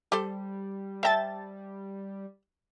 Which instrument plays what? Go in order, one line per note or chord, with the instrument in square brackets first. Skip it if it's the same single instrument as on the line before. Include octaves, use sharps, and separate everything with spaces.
[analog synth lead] G3 [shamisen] G4 A4 C5
[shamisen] C5 G5 [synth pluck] E5 A5 A6